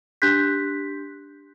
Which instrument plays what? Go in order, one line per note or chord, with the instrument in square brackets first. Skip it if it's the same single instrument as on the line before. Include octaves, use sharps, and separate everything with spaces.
[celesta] D4 G4 C6 F#6 G6 B6